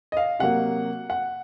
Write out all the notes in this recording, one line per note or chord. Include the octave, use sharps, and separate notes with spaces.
D#5
F5
C3 F#3 A#3 F#5
F#5